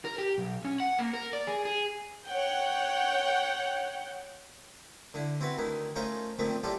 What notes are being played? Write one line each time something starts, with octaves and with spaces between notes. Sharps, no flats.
A#4
G4
B1
C#4
F#5
A#3
A#4
D5
G#4
G#4
C#5 F#5 G5
D3 E4
C4 E4 F#4 B4
D2 D#3 E4
A3 C#4 D#4 F4 A#4 C5
A#2 D#3 F3 A3 C4
A2 G3 F4 G4 A4